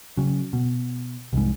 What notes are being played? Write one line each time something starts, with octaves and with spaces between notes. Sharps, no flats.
C#3 F#3
B2
C2 F2 G#2